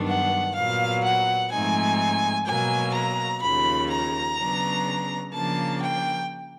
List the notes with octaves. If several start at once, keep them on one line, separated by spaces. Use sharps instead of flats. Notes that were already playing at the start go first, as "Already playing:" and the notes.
Already playing: G2 D#3 F#3 B3 D4
F#5
A#2 F#3 B3 F5
F#5
G#2 F3 A3 C4 D#4 G#5
B2 F#3 A#3 G#5
A#5
D#2 C#3 F3 B5
A#5
C#3 F#3 B3 D4
C#3 F3 A#3 D4 A5
G5